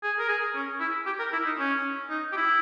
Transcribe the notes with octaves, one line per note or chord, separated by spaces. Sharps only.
G#4
A#4
G#4
C#4
E4
G4
A#4
E4
D#4
C#4
D#4
G4
E4